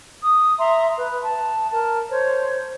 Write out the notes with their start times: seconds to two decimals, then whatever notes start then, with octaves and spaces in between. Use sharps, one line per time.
0.23 D#6
0.58 E5 A#5 C6
0.96 B4
1.22 A5
1.71 A#4 A5
2.09 C5 C#5